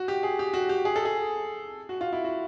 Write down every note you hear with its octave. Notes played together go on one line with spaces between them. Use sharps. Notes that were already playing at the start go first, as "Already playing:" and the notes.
Already playing: F#4
G4
G#4
G4
F#4
G4
G#4
A4
G#4
F#4
F4
E4
F#4